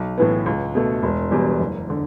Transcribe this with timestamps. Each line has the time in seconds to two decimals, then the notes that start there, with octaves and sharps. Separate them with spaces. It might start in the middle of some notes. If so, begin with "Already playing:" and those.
Already playing: B1
0.18 A2 E3 B3
0.46 C#2
0.75 B2 A3
1.03 E1
1.31 E2 B2 G3
1.60 F#1
1.90 D3